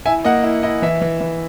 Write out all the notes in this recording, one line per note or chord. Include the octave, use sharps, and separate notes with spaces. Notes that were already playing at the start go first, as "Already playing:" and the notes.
E4 E5 G#5
A#3 D#5 F#5
E4
E4 D#5
E3 E5
E3
E3